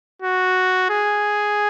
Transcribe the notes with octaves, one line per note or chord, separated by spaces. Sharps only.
F#4
G#4